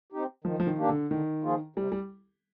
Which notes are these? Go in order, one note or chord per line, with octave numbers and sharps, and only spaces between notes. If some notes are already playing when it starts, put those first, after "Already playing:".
C4 D#4 G4
D#3 F3
F3
D#3
A#3 D4 G4
D3
D3 D#3
F3 A#3 F4 G#4
C3 G3
G3